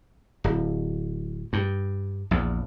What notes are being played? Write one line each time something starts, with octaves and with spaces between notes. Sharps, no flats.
D1
G2
A#1 E2